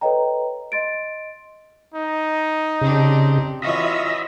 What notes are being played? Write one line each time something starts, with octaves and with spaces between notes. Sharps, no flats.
A4 B4 C#5 D#5 G5 A#5
D#5 C6 A6 D7
D#4
C#3 C4 D4 G4
E3 F4 F#4 C#5 D#5 E5